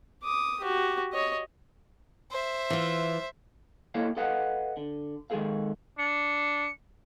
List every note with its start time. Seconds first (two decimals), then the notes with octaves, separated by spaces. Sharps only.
0.23 D6 D#6
0.60 F#4 G4
1.13 C#5 D#5
2.31 C5 E5
2.70 E3 F4
3.94 A#3 E4 A4 C#5 D#5 F5
4.17 A4 B4 D#5 F5 F#5
4.77 D3
5.30 D#3 G#3 A#3 G#4 A4 F5
5.98 D4 C#7